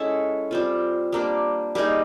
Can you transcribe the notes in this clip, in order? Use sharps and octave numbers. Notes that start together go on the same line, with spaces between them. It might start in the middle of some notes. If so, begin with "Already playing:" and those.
Already playing: G#3 C#4 E4 A4
G3 C4 F4
G3 A#3 D4
G3 A#3 D#4 G#4